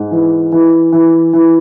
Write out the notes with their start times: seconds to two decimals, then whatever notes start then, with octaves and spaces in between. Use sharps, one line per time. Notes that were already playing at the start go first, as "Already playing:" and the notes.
Already playing: G#2
0.11 E3
0.52 E3
0.92 E3
1.33 E3